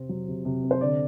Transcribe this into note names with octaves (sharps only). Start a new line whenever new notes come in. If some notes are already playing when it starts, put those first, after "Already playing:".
Already playing: C3 C4
F#3
C3
C3
C4
C5
D3 D5